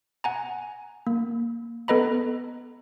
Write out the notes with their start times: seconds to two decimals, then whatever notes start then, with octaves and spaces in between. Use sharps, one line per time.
0.24 F#5 G#5 A#5
1.07 A#3
1.88 B3 A4 B4 D#5 A#5 B5